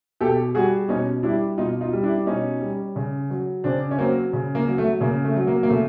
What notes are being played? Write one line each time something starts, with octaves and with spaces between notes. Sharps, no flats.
B2 G4 A4
G3 F#4 G#4
B2 C#4 D#4
G3 D4 E4
B2 D#4 F4
D#4 F4
G3
D4 E4
B2 C#4 D#4
G3
C#3
F#3
C#3 C4 D4
C#4
F#3 A#3 C4
C#3
A#3
F#3
A3
C#3 A#3
A3
F#3
A#3
A#3
C#3 A3